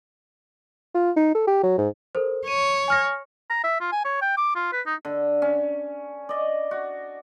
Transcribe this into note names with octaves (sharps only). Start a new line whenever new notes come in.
F4
D#4
A4
G4
F#3
G#2
A4 A#4 C5
C#5 D#7
G#5 F6 A#6
A#5
E5
F4
G#5
C#5
G5
D6
F4
B4
D#4
D3
C#4
D5 D#5
F#4